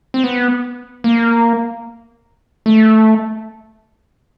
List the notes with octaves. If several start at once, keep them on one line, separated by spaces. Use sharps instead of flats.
C4
B3
A#3
A3